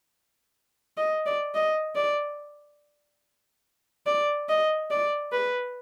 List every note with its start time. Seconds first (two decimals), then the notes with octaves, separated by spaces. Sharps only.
0.97 D#5
1.26 D5
1.54 D#5
1.96 D5
4.06 D5
4.49 D#5
4.91 D5
5.33 B4